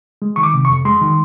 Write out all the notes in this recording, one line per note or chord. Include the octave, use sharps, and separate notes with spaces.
G#3
D#3 C#6
D6
C3
C#6
F2
G#3 C6
D#3